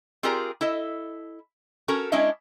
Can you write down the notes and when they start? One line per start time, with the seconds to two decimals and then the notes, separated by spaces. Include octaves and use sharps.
0.23 C4 F4 G4 G#4 A#4 D5
0.61 E4 A4 D#5
1.88 C#4 F#4 A4 A#4
2.12 G#3 C#4 D4 E4 D#5 E5